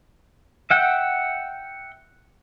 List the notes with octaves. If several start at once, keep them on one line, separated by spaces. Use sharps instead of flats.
E5 F#5 G5